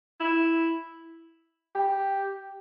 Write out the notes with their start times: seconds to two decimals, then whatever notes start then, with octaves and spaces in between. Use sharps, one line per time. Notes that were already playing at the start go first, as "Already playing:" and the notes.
0.20 E4
1.75 G4